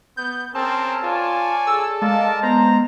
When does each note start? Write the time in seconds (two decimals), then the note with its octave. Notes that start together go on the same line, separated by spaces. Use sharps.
0.17 B3 G6
0.55 C4 C#4 G#4 A#4 A5
1.03 F4 C#5 D5 G#5
1.67 G#4 A4 E6
2.02 G#3 A#4 D5 F5 A5
2.43 B3 C5 A#5